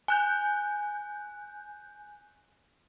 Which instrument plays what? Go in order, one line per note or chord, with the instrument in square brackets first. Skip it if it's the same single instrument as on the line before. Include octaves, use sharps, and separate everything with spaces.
[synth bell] G#5 F#6 G6